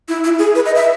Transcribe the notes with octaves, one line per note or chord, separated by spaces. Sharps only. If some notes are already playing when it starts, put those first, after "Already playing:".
E4
E4
G#4
B4
D#5
E5